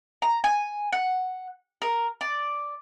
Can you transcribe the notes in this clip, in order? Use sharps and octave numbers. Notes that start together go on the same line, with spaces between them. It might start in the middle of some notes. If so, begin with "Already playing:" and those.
A#5
G#5
F#5
A#4
D5